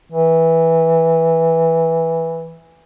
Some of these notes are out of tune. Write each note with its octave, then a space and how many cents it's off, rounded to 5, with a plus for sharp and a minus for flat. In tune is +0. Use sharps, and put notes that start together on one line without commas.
E3 -10